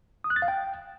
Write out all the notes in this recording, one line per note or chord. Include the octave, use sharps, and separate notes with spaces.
D#6
F#6
A6
F5
G5